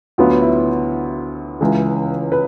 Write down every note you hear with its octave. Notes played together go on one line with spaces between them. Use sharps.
D2 D3 F#3 B3 F4
E4
C#2 C#3 E3
B4